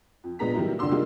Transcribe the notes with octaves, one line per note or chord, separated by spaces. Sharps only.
F2
A#1 G#3 B3 A#5 B6
D#3 F#3 G3 A#3 E4
C2 F2 D3 D4 C6 E6
F3 G3 G#3 A#3 D#4 F4